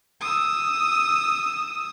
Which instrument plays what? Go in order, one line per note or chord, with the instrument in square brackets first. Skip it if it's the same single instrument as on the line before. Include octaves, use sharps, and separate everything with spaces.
[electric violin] D#6 E6